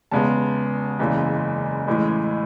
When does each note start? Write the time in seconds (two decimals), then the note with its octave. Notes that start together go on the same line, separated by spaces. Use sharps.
0.11 E2 C#3 G#3 B3 A5
0.99 F#1 E2 C#3 E3 G#3
1.87 A1 A2 E3 G#3